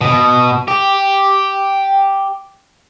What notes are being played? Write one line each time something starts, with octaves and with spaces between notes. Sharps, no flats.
B2
G4